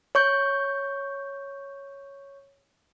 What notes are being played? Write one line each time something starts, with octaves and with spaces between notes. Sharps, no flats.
C#5 C#6 G6